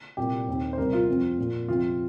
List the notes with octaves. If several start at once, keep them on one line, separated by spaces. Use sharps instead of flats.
C2 A#2 A#3 G4
D#2 D#3 C4
C5
C2 C3 G3 A#4
F4
F2 F3 C4
A#2 A#3
F2 C3 F3 C4 F4